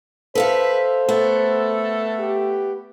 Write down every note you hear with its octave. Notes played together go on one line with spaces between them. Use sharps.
A4 B4 C5 E5 F5
A3 B3 A4
G4